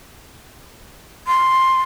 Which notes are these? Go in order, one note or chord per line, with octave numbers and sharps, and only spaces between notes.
C6